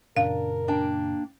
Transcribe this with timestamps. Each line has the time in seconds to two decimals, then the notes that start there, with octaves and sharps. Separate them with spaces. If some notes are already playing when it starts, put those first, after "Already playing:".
0.17 F#2 A#2 C#3 D4 A#4 F5
0.68 A#3 D4 G5